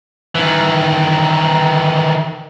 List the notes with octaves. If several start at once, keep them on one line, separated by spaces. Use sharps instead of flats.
D#3 E3